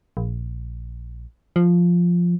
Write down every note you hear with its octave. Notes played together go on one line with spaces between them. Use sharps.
A#1
F3